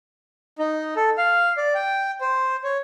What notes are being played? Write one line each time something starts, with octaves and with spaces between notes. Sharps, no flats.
D#4
A4
F5
D5
G5
C5
C#5